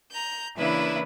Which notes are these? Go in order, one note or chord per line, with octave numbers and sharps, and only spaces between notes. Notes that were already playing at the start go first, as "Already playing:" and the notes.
A#5 G6
C#3 E3 A#3 D4 E4 B4